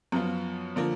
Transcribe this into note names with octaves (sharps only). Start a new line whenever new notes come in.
F#2 F3 B3 F4
D3 F3 A#3